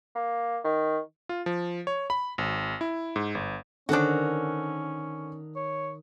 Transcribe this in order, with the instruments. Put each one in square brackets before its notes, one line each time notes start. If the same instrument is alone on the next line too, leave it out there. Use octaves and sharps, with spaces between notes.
[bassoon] A#3
D#3
[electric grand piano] F4
F3
C#5
B5
G#1
E4
G#2
G1
[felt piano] D3 C5 F#6 [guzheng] D#3 A4 [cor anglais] C#4 [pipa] D4 F#4
[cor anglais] C#5